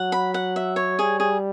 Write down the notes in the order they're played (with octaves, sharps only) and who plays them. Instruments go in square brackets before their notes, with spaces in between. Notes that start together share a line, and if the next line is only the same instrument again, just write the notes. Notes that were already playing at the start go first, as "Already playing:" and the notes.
Already playing: [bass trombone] F#3 [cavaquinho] F#5
[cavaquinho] B5
F#5
E5
C#5
[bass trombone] G3 [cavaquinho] G#4
[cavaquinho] G#4